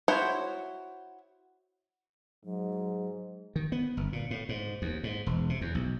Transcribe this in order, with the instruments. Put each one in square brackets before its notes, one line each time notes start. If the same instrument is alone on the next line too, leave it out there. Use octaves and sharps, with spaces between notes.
[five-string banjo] E4 F#4 C5 C#5
[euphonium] G#2 [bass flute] F#3
[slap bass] D#3
B3
G1
A#2
A2
G#2
D#2
G#2
E1
C3
E2
B1